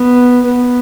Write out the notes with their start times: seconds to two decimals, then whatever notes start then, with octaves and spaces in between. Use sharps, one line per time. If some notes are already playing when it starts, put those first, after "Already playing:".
Already playing: B3
0.45 B3